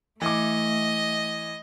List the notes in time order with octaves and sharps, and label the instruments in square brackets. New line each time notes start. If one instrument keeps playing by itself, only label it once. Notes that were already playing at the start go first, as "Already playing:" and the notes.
[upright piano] E3 D6 [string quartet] A3 [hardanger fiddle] D#5